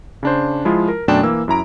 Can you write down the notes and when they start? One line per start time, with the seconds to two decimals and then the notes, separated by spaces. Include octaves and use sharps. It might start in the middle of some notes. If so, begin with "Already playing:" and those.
0.23 C#3 D4 C5
0.65 F3 G#3 E4 F4
0.88 A#4
1.08 F#2 B2 A3 D4 G5 E7
1.23 E3 A#3 E6
1.48 F#2 E4 A#5 D7